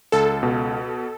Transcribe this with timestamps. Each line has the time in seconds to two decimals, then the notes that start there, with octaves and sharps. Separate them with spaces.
0.12 C#2 A4
0.43 B2